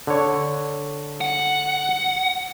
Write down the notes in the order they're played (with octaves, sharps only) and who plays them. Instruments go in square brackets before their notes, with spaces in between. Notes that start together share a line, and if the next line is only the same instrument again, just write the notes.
[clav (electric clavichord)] D3 C#5
[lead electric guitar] F#5